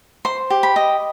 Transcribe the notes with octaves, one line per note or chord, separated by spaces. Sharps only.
C5 C6
G4
B5
D#5